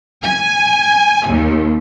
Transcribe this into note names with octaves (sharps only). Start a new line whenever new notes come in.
G#5
D#2